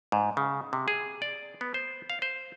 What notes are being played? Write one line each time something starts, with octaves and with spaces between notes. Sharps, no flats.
G#2
C#3
C3
G#4
D5
B3
C5
F5
C5